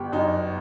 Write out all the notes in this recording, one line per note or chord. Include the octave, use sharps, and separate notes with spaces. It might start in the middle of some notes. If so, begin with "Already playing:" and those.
Already playing: G1 G4
F#2 D#4